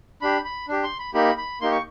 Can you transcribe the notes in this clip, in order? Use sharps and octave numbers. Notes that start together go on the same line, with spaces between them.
D4 G4 B5
B5
D4 G4
C6
B5
A#3 D#4 G4 B5
B5
A#3 D#4 G4 C6
C#6